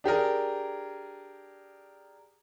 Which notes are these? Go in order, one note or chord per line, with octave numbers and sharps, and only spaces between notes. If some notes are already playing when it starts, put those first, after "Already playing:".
D4 G4 G#4 A#4